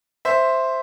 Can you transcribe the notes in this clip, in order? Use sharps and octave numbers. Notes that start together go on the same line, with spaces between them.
C5 E5